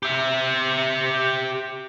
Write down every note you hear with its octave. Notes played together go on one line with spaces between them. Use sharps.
G4 E5